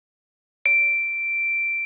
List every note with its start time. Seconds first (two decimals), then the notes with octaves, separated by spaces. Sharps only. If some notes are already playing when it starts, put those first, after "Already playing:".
0.66 D7